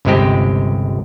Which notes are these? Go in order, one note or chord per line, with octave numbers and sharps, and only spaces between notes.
G1 C#2 C3 G#3 C4 G4